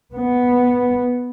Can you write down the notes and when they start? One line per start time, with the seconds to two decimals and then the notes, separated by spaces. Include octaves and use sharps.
0.15 B3